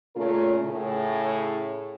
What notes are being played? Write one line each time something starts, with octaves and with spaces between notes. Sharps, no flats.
A#2 C#3 A3 C#4 F4 A#4
A2 C#3